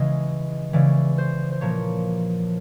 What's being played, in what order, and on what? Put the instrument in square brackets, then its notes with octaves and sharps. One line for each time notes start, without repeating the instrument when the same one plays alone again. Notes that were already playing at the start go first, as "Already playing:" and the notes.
Already playing: [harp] C#3 E3 G#3 D#5
C#3 E3 G#3 D5
C5
C5
A#2 F3 A#3 C#5